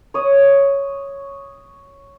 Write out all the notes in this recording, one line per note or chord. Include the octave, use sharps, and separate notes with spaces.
C#5 D#6